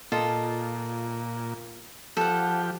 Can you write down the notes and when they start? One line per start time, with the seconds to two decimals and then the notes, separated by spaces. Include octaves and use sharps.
0.12 A#2 F4 A4 D#5
2.17 F3 G4 A4 F#5